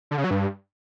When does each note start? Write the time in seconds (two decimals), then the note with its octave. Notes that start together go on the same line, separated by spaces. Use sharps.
0.11 D3
0.18 C#3
0.24 F#3
0.31 G2